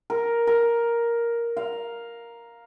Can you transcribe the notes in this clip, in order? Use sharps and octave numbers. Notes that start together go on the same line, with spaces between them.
A#4
A#4
F5